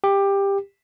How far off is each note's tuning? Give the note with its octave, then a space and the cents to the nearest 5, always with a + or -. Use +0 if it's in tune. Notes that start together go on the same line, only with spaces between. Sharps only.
G4 +15